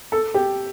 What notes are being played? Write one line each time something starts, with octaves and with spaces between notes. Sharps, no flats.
A4
G4